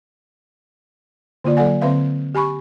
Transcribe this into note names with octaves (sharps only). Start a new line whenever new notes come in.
D3 A#3 F4 D5
F#3 A4 D5 F#5 G#5
D3 C4 B4 E5 F5
G4 G#5 B5 C#6